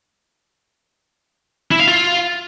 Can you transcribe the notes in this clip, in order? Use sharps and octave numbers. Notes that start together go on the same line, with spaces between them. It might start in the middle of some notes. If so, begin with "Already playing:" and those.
E4
F5
F4